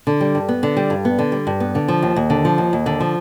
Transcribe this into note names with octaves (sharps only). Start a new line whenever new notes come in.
D3
G3
G2
B3
D3
G3
G2
B3
D3
G3
G2
B3
D3
F3
D#2
D#2
D3
F3
D#2
D#2
D3
F3